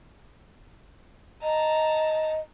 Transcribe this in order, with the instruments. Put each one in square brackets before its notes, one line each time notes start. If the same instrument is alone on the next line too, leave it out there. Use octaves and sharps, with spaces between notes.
[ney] D#5 [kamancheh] A5 A#5